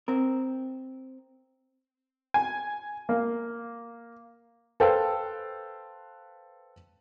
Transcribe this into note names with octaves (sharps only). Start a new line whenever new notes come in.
C4 A#4
G#5
A#3
A4 B4 C5 F5 G5 E6